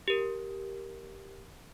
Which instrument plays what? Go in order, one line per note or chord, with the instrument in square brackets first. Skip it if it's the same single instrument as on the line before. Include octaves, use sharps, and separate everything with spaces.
[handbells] G4 A#4